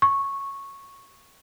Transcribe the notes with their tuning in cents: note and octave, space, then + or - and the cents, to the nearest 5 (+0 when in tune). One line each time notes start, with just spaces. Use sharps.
C#6 -10